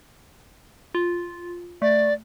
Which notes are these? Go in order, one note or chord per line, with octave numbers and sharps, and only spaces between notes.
F4
A3 D5